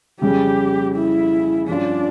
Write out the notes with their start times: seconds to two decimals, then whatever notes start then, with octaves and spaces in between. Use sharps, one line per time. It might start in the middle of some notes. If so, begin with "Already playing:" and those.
0.21 F2 C#3 G3 C#4 G4
0.95 E4
1.68 G2 F3 C#4 D4 F4